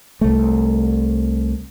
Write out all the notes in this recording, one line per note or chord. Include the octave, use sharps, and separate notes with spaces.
C2 A3